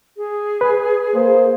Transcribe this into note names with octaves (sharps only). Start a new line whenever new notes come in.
G#4
B4
A#3 C5